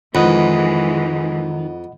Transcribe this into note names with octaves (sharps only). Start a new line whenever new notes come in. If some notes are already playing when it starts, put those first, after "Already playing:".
F2 D#3 E3 G#3 D#5 F#5 B5